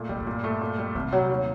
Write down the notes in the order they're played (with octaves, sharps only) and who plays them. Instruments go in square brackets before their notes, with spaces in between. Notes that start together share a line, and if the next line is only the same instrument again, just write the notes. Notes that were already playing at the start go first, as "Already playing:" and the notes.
Already playing: [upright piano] A#2 A3
[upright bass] G2 [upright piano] G3
[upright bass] F#2
[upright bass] G2 [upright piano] A#2
[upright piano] A3
A#2
G3
[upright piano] C2 [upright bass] D#3
[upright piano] C3 [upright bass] F#3
[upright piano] D#2